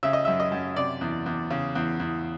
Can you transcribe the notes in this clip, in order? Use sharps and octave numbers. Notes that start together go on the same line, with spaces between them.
C#3 E5
D#5
F#2 E5
D#5
F#2
C3 D5
E2
E2
C#3
E2
E2